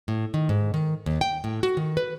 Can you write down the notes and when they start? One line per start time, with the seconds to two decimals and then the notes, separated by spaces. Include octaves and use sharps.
0.08 A2
0.34 D#3
0.49 G#2
0.74 D#3
1.06 D#2
1.21 G5
1.44 A2
1.63 F#4
1.77 D#3
1.97 B4